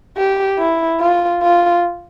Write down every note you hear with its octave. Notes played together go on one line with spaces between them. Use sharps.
G4
E4
F4
F4